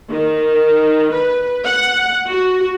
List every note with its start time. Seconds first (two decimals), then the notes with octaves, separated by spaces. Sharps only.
0.11 D#3
1.14 B4
1.66 F#5
2.27 F#4